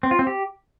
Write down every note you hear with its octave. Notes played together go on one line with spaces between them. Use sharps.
C4
F4
C4
G4